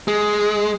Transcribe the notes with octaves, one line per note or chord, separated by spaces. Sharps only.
G#3